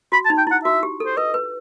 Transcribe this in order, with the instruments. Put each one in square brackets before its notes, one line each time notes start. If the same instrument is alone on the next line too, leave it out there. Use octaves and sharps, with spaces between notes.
[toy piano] F#4 [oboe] B5
[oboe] A5
[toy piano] D#4
[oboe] G5
[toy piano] E4 [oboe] F#5
[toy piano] F#4 [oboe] E5
[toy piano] G4
A4
[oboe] C5
[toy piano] B4 [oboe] D#5
[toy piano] B4